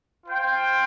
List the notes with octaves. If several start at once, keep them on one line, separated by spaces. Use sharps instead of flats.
F4 C5 G5